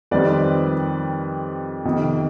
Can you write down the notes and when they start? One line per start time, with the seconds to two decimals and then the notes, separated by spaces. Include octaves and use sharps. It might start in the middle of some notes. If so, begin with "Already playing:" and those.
0.11 F2 D#3 G3 C4 B4 D5
1.85 F2 C3 D#3 B3